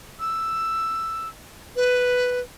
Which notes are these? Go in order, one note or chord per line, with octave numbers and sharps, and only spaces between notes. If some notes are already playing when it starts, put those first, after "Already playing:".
E6
B4